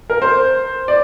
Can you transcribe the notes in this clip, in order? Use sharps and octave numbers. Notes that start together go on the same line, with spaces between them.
A#4
C5
D5